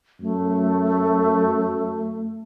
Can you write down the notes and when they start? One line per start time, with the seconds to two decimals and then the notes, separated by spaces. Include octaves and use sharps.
0.21 F#2 A3